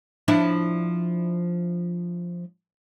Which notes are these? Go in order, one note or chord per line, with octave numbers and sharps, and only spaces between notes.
F3 D4 E4